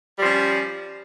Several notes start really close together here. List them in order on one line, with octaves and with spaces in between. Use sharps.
G3 F3 C#4